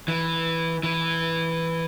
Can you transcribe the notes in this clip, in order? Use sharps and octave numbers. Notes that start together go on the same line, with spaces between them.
E3
E3